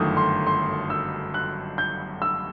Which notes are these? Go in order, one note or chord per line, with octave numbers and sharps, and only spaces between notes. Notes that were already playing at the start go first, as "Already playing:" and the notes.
Already playing: G1 F#2 D#3 A3 D#6
C6
C6
E6
F#6
G6
E6